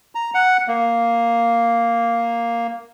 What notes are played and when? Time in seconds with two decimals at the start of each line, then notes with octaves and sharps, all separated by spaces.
0.15 A#5
0.34 F#5
0.68 A#3